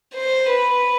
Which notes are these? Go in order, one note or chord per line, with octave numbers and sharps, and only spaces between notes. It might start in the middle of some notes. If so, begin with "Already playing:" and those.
C5
B4